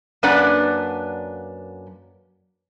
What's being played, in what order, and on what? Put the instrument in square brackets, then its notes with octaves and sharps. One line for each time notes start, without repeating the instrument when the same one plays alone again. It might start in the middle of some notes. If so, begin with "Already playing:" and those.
[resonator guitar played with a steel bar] F#2 A#3 D4 B4 D5 F#5